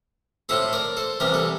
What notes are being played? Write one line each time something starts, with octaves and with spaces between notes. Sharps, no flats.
A2 F3 A3 C4 A4 C5
A#4 D5
A4 C5
C2 C3 E3 G3 A#4
A4